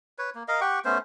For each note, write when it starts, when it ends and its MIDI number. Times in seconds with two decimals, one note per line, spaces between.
0.18 0.30 71
0.18 0.30 73
0.35 0.43 58
0.48 0.60 70
0.48 0.60 75
0.48 0.60 77
0.61 0.79 67
0.61 0.79 78
0.61 0.79 79
0.61 0.79 85
0.85 0.98 57
0.85 0.98 59
0.85 0.98 61
0.85 0.98 72